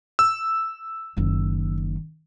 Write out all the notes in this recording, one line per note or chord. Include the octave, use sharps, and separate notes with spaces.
E6
F#1 D#3